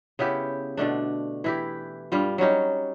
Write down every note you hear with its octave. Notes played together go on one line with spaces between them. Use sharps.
C#3 B3 E4 G4
B2 D3 A3 D4
E3 E4 G4
G2 G3 F4
F#3 G3 C#4 D#4